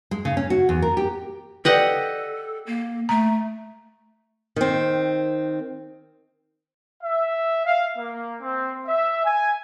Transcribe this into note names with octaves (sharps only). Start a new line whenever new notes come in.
G#3
C#3
C#4
F#4
E2
A#4
G4
G4 A4 B4 D5 D#5 F#5
A#3
A3 A#5
D#3 C4
E5
F5
A#3
C4
E5
G#5